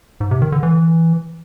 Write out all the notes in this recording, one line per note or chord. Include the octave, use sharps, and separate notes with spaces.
G#2
C3
D#3
D3
E3